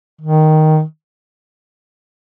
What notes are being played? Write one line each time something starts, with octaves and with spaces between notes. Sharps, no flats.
D#3